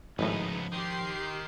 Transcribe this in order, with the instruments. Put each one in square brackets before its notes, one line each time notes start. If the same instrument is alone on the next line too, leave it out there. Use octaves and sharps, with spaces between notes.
[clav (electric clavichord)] G#1 A2 [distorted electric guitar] C#2 B3 [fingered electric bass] F3 [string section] D#4 G#4
[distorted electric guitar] D#3 [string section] G4 C6 C7